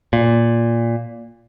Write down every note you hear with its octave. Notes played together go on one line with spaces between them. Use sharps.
A#2